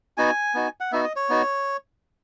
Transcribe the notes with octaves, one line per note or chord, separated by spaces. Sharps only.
B3 D#4 F#4 G#5
B3 D#4 F#4
F#5
B3 D#4 F#4 E5
D#5
C#5
B3 D#4 F#4